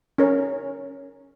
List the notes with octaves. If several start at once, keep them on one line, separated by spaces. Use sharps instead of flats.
C#4 A#4 C#5